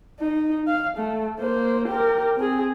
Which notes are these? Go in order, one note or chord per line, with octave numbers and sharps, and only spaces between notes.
D#4
F5
A3
A#3 C5
G4 A#4
C4 G#4